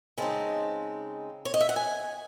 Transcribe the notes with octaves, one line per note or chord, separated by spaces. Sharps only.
C#3 G#3 C4 D#4 A5
C#5
D#5
E5
F#5
G#5